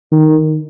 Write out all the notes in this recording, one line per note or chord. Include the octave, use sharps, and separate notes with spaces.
D#3